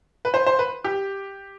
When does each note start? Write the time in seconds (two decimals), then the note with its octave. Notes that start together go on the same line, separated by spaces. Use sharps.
0.25 B4
0.34 C5
0.46 C5
0.59 B4
0.84 G4